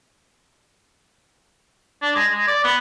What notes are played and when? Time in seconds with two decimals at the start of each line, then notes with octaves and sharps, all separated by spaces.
2.02 D4
2.15 G#3
2.31 G#3
2.47 D5
2.64 B3